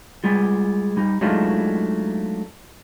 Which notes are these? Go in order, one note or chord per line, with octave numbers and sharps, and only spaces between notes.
G3 G#3 F4
G3 D#4
F#3 G#3 A3 D4 D#4 F4